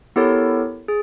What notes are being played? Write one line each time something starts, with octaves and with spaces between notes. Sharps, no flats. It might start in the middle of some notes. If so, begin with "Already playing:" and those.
B3 E4 G4 A4 A#4 C#5
G#4